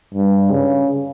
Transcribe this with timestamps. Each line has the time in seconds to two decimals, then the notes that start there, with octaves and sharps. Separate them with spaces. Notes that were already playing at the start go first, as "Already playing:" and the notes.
0.14 G2
0.51 C#3